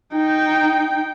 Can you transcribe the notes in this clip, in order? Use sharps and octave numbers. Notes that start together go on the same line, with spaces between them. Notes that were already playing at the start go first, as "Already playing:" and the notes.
D#4 G5